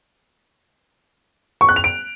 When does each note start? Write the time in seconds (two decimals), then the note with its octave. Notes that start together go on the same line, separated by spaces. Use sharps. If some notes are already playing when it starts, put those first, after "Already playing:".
1.61 C#6
1.69 F#6
1.76 F7
1.84 D7